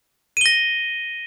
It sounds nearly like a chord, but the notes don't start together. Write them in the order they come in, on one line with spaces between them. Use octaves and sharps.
D#7 G7 A#6